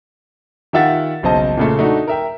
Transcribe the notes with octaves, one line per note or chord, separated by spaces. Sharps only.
D#3 F4 G4 E5 F#5 A6
D#1 B1 C#3 C5 D#5 A5
A#2 C#3 A3
A3 D4 D#4 F#4
A#4 E5 G5